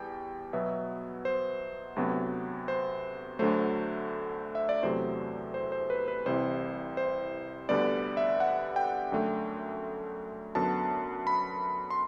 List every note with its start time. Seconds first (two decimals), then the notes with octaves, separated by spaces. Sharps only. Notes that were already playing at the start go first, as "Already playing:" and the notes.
Already playing: E2 G3 G5
0.53 B2 F#3 B3 E5
1.25 C5
1.96 D2 C3 F#3 B3
2.68 C5
3.39 D2 D3 F#3 A3 C5
4.55 E5
4.69 D5
4.83 E2 C3 F#3 A3 C5
5.54 C5
5.72 C5
5.90 B4
6.08 B4
6.26 C2 C3 E3 C5
6.97 C5
7.69 D2 D3 G3 B3 D5
8.17 E5
8.40 F#5
8.76 G5
9.12 F#2 D3 A3
10.55 F#2 D3 F#3 B3 A5
11.27 B5
11.90 C6